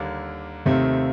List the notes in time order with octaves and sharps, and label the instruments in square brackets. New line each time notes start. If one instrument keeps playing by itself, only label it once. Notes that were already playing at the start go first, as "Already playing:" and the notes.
Already playing: [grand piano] D#2 D3 G3 A#3
[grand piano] D#2 D#3 A3 C4 F4 [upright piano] C3